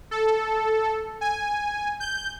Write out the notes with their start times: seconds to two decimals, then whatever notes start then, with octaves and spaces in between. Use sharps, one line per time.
0.11 A4
1.21 G#5
2.00 G6